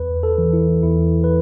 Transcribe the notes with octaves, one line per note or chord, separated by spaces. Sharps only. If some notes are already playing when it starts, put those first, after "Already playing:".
Already playing: E2 B4
A4
E3
E4
E2 E4
B4